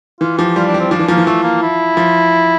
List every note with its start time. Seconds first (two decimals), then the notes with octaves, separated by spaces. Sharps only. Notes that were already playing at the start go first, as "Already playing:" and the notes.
0.21 E3 F4
0.38 F3 G4
0.56 G3 F4
0.68 D4
0.74 G3
0.80 C4
0.91 F3 D4
0.99 E3
1.08 F3 A#3
1.17 E3
1.26 F3 A3
1.44 A#3
1.62 E4
1.97 F3